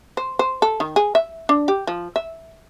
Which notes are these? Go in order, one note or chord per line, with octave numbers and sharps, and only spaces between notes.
C5
C5
A4
D#3
G#4
E5
D4
G4
F3
E5